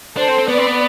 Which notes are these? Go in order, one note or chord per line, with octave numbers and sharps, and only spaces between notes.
D4 A4 C5
C4
C4
B3 B4 D5
C4
B3